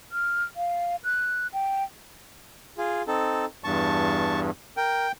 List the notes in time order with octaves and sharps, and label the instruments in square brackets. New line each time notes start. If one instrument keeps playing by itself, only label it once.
[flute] F6
F5
F#6
G5
[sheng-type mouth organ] F4 G#4
C4 D#4 A4
[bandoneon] E2 G2 [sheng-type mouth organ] A5 C#6
[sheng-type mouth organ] A#4 [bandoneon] G5